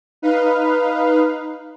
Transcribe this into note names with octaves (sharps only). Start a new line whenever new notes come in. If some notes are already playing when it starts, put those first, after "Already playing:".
D#4 B4 F5